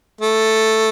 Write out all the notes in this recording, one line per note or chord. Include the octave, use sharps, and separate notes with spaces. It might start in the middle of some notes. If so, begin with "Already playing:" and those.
A3